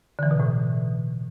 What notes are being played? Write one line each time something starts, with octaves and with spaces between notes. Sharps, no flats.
D3
E3
B2
A2